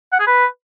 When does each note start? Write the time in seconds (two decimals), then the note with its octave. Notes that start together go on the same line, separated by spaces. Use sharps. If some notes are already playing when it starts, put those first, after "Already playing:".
0.13 F#5
0.20 G#4
0.27 B4